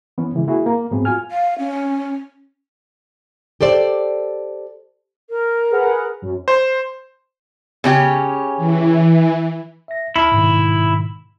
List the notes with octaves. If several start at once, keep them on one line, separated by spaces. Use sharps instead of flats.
E3 B3 C#4
C#3 E3 G#3
A#3 E4 F#4 G#4
A#3
G#2 F#3 A3 B3 C4 G#4
F4 F#4 G#5 F6
F5
C#4
G4 A4 C5 D5
A#4
G#4 B4 F#5
F#2
C5
C#3 C#4 G4
E3
E5 A#6
D2 E4 A5 F6
G#2 B2 D#3